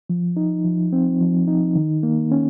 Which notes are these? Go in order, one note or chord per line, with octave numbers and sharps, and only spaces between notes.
F3
D#4
F3
C4
F3
D#4
D#3
A#3
C#4